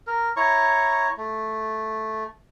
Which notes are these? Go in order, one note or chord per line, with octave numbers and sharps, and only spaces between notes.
A#4
E4 C#5 A#5 C#6
A3